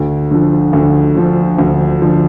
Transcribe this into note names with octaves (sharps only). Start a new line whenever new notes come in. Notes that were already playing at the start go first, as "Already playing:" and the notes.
Already playing: D2
D3 F3
D2
D3 F3
D2
D3 F3